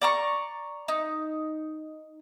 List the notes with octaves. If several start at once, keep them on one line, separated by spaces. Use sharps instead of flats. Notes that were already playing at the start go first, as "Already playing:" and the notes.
D5 A#5 C#6
D#4